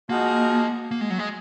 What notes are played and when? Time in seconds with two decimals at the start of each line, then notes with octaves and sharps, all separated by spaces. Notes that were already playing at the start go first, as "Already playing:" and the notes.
0.09 F3 G#3 A#3 D#4 F#4
0.91 A#3
1.01 G#3
1.10 F#3
1.18 G#3